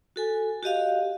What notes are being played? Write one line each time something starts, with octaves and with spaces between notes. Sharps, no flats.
F#4 A4 G#5
F#4 G4 D#5 F5